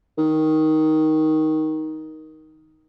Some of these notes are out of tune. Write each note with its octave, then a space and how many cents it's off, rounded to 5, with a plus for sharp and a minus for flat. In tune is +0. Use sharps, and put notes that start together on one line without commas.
D#3 +10